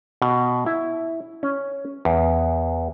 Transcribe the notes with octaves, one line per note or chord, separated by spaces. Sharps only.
B2
E4
C#4
E2